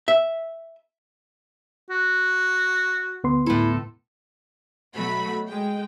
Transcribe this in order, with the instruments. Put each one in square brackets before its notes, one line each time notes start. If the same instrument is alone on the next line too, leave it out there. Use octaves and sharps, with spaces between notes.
[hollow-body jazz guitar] E5
[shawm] F#4
[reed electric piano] D2 B3 C6
[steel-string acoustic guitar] A2 A4 [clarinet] E4
[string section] B2 F#3 A3 F#4 B5
G#3 G5